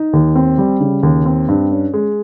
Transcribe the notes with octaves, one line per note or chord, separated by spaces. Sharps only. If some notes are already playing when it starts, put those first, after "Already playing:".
Already playing: D#4
D#2
C4
G3
C#3
D#2
C4
G2
C#4
G#3